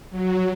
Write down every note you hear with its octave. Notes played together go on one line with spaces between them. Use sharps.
F#3